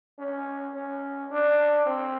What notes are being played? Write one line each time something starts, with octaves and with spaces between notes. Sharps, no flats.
C#4
C#4
D4
C4